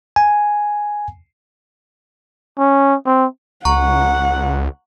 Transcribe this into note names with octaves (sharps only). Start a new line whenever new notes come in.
G#5
C#4
C4
C#2 F#5 A#5 C#6